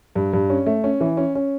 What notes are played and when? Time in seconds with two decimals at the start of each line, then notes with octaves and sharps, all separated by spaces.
0.16 G2
0.33 G2
0.50 C#4
0.66 A3
0.84 C#4
1.01 E3
1.17 C#4
1.35 C#4